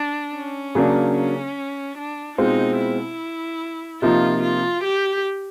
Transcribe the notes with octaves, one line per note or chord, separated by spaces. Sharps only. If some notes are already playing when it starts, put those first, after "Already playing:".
Already playing: D4
C#4
C#3 F#3 A#3 D4
C#4
D4
B2 G#3 C4 D#4 F4
E4
C3 F3 A#3 D#4 F4
F4
G4